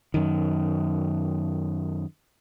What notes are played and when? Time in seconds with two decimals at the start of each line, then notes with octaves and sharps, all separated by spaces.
0.14 F#2 D#3